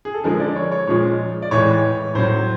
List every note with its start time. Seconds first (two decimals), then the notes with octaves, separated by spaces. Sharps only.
0.05 G#4
0.14 A4
0.24 D3 F3 G#3 A#4
0.40 D5
0.56 C#5
0.72 C#5
0.87 A#2 F3 G#3 C#5
1.42 D5
1.51 A2 E3 G#3 C#5
2.15 A2 F#3 C5